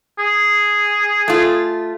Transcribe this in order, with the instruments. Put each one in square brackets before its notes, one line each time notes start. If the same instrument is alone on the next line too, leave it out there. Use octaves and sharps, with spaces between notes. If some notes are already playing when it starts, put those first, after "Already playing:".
[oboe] G#4
[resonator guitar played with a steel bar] A3 F4